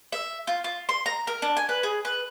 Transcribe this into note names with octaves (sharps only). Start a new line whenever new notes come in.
E5
F4
F4
C6
A#5
A#4
D4
G#5
B4
G#4
B4